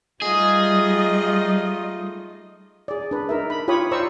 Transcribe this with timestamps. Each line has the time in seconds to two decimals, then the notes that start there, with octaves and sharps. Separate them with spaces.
0.22 G3 A3 D#4 F4 G#4 D#5
2.88 G#4 D5
3.11 D4 B4
3.29 D#4 A#4 E5
3.50 B5
3.68 F4 G4 C#5 B5 D#6
3.91 C5 D5 F5 A#5 C#6 E6